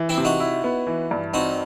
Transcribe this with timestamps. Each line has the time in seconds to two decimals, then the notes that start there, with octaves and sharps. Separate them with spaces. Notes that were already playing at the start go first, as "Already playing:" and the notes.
Already playing: E3
0.09 C4 E4
0.18 C3
0.25 D#4 F#4
0.40 E4
0.64 B3
0.87 E3
1.11 G2
1.33 C4 D#4 F#4